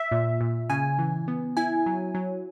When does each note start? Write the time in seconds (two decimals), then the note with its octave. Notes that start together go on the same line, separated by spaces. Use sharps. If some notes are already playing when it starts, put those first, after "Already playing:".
Already playing: E5
0.12 A#2
0.41 A#2
0.70 C#3 G#5
0.99 E3
1.28 B3
1.57 E4 G#5
1.86 F#3
2.15 F#3